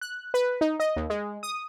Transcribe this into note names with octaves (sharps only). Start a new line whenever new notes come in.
F#6
B4
D#4
D#5
D#2
G#3
D#6